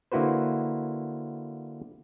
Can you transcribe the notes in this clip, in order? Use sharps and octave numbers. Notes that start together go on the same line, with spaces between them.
D3 A#3 E4 F#4 B4 C5